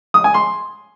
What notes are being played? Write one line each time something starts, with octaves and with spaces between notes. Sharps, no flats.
D#6
G#5
C6